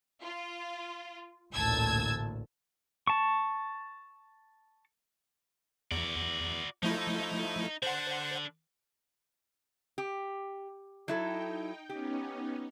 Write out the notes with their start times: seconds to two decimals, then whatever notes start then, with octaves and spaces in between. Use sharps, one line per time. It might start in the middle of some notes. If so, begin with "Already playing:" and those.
0.23 F4
1.53 A1 D2 A#2 A5 E6 G#6
3.07 A5 C#6
5.91 E2 F#4 D5
6.83 F3 A3 D#4 E4
7.83 D3 D4 C5 F#5
9.98 G4
11.08 F#3 D#4 E4 A4 G5
11.89 B3 C#4 D#4 G4